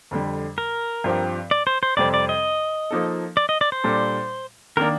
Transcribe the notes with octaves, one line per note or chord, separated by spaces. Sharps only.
F2 D3 G3
A#4
G2 F3 C4 G4
D5
C5
C5
F2 C3 G3 C4 D5
D5
D#5
F3 A#3 D#4 A4
D5
D#5
D5
C5
A#2 G3 D4 A4
D#3 A#3 D4 A#4